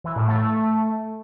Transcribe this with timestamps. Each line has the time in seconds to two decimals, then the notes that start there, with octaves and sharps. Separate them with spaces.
0.04 E3
0.16 A2
0.28 A3